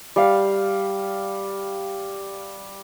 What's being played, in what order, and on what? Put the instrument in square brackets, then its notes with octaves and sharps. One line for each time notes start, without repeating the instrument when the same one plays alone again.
[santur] G3 F5